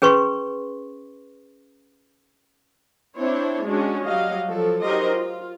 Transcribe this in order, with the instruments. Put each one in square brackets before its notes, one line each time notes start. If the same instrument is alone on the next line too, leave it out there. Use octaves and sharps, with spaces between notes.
[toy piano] C#4 G#4 B4 C6 C#6
[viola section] C4 D4 E4 C5 C#5
G#3 C#4 D4 F#4
F#3 G3 F#4 D#5 F5
F3 F#3 A4
F#3 D#4 G4 A#4 C5 D#5
F4